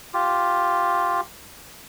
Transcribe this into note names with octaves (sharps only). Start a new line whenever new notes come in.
F4 G4